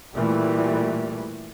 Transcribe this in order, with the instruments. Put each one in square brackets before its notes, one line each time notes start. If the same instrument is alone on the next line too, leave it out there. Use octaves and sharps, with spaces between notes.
[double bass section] A#2 E3 G3 A3